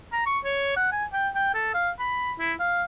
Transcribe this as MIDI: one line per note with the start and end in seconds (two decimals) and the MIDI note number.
0.13 0.26 82
0.26 0.39 85
0.45 0.73 73
0.76 0.90 78
0.92 1.05 80
1.13 1.29 79
1.35 1.52 79
1.54 1.71 69
1.74 1.90 77
1.99 2.33 83
2.39 2.53 64
2.60 2.83 77